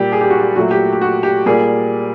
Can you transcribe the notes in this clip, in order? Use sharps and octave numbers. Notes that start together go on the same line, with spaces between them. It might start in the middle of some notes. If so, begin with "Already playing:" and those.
Already playing: A#2 G3 A#3 G4
G#4
G4
F#4
G4
A#2 F#3 A3 F#4
G4
G4
F#4
G4
A#2 G3 A#3 G#4